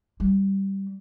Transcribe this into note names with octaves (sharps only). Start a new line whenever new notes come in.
G3